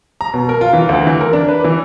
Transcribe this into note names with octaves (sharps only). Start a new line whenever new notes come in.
A#5
B2
A#4
F4
E3
D2
E3
A#4
D4
B4
E3